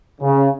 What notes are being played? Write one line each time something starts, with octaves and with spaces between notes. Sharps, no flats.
C#3